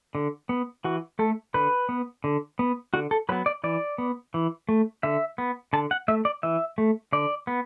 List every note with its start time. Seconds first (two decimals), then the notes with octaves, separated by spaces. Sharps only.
0.15 D3
0.49 B3
0.84 E3 F#4
1.19 A3 A4
1.54 D3 B4
1.89 B3
2.24 D3
2.59 B3
2.94 D3 F#4
3.11 A4
3.29 F#3 B4
3.32 B3
3.46 D5
3.64 E3 D5
3.98 B3
4.34 E3
4.69 A3
5.03 D3 E5
5.38 B3
5.73 D3 A5
5.91 F#5
6.08 A3 E5
6.25 D5
6.43 E3 E5
6.78 A3
7.13 D3 D5
7.47 B3